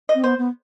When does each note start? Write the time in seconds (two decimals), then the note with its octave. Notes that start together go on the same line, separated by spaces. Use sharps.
0.09 D#5
0.15 C4
0.23 B3 C5
0.38 B3